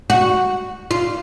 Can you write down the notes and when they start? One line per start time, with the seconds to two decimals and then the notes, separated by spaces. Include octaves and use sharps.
0.10 F#4
0.91 F4